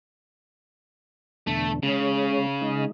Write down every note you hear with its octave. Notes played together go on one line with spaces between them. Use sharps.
E2 B2 D3 A3
C#3 G#3 C#4
G#3 D#4